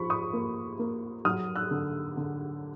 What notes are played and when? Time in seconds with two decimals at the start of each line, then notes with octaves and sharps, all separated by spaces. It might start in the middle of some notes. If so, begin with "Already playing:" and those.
Already playing: F3 B5 C#6
0.10 C#6 D#6
0.33 A#3
0.79 A#3
1.25 F#3 D#6 F6
1.55 E6 F#6
1.71 D3
2.17 D3